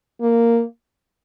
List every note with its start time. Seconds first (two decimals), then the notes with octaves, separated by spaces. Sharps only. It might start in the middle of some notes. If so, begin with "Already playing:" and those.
0.21 A#3